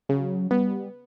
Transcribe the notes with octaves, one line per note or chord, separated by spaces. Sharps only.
C#3 F#3
G3 B3